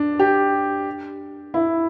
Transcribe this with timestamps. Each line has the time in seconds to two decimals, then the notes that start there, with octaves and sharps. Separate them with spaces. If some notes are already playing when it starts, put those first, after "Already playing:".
Already playing: D4
0.19 G4
1.54 E4